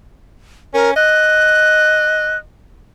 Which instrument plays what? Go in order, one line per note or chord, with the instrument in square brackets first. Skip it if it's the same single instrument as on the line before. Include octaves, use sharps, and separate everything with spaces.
[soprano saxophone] C#4 [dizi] A#4
[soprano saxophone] D#5 [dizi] F#6